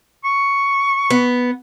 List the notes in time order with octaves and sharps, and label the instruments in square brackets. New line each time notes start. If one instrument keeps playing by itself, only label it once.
[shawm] C#6
[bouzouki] B3